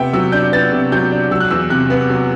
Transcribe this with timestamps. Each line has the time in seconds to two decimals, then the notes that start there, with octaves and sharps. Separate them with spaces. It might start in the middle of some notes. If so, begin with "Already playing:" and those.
Already playing: C3 B3 E5 G5
0.13 F#3 E6
0.32 D4 G6
0.53 B3 A6
0.72 C3
0.92 F#3 G6
1.12 D4
1.31 F#3 E6
1.40 F#6
1.51 E2 E6
1.70 C3 F#6
1.90 B3
2.10 F#3